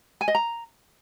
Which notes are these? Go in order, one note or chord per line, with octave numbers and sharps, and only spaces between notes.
G#5
D#5
A#5